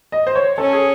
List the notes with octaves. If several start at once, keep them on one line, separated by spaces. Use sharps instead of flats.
D#5
C5
C#5
C#4 A4
G#4